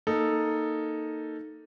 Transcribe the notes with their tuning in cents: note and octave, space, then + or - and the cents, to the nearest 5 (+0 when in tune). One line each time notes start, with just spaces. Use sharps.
A#3 +0 D#4 +0 A4 +0